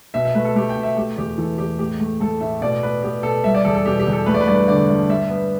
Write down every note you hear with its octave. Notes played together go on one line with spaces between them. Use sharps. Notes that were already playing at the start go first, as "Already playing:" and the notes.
B2 E5
E5
A3 B4
A4
A3 G4
G5
B2
E5
A3 G4
E2 G4
E3 A4
E2 G4
A2 G4
A3
A3 A4
A2 E5
B2 D5
B3 B4
B3 G4
B2 A4
G3 E5
D5
E2 A4
A4
B2 G4
G4
E2
A4
A3 B4
D5
B4
G2 D5
B4
D3 D5
G2
G3 E5
B3